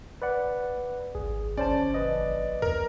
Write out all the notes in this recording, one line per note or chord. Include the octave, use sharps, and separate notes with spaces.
B4 D5 F#5
G#1 G#4
G1 C#4 C5 D5 A5
A#1 B4 D#5
D#2 A#4